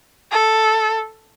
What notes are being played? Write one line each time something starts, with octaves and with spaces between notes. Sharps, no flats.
A4